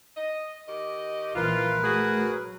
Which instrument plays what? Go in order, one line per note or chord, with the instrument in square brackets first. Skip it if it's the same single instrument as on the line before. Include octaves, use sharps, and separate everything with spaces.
[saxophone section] D#5
D#3 G4 D#5
[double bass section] A#1 E3 F3 [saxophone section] F4 [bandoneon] A#4 B4
[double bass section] A3 [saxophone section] F#4 G#4
[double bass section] F#3